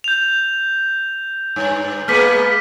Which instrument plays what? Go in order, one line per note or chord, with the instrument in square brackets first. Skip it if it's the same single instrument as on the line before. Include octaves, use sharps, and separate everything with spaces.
[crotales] G6 F7
[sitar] G2
[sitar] G#3 A#3 B3 [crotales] F6 B6 C#7